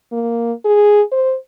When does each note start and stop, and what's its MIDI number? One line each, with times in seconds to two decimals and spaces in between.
0.12 0.53 58
0.65 1.02 68
1.12 1.35 72